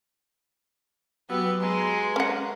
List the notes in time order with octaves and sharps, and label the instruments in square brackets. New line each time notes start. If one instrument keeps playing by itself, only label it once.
[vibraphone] F#3 F#4 E6 [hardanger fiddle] B3 [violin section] G4 B4 C#7
[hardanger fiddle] G#3 [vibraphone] B4 A#5 [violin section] C6
[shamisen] C#4 F#5